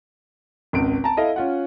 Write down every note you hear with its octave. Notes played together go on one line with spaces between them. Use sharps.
G#1 C#2 D7
A5 A#5
E4 A4 D#5 F5
C#4 F4 F#5